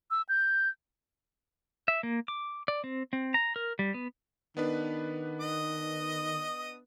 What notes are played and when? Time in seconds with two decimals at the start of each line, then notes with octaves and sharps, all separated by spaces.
0.11 E6
0.29 G6
1.88 E5
2.03 A#3
2.28 D6
2.68 D5
2.84 C4
3.13 C4
3.34 A#5
3.56 A#4
3.79 G3
3.94 B3
4.57 D#3 B3 D4 B4
5.41 D#5 D#6